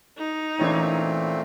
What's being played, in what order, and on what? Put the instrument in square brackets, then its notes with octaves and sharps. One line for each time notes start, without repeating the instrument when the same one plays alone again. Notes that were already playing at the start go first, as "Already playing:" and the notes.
[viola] D#4
[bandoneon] A#2 A3 C4 [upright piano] E3 C#4